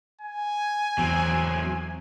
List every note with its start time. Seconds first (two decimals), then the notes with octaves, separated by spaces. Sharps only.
0.21 G#5
0.98 E2 F#3 C4